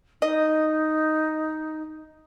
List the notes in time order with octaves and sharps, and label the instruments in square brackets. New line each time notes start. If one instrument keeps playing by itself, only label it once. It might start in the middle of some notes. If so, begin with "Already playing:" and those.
[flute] D#4 [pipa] D#5